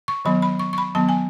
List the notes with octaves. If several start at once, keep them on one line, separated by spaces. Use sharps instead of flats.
C#6
D#3 F#3 B3 B5
B5
C#6
C#6
B5
D#3 F#3 B3 A5
G#5